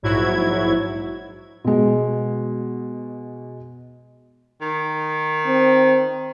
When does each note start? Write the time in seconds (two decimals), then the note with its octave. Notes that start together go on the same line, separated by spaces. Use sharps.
0.02 A#1 G#2 F#3 E4 F#4 G#6
1.64 B2 G#3
4.61 D#3
5.47 C4